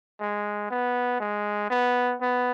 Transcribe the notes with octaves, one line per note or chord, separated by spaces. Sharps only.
G#3
B3
G#3
B3
B3